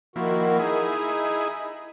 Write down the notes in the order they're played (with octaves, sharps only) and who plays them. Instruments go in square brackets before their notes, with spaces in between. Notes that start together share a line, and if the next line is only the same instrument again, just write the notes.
[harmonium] D#3 F#4 [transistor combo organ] F3 A#3 E4
[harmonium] D#4 [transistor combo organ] E4 G#4